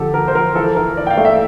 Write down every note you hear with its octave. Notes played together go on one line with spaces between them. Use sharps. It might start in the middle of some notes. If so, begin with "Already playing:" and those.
Already playing: D3 F3 G4 A4
F3 A#4
C5
F3 A#4
E3 A4
E3 A#4
E3 D5
G5
F5
A3
E5